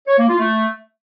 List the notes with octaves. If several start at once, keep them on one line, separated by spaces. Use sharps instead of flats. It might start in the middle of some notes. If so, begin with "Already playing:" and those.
C#5
A#3
F4
A3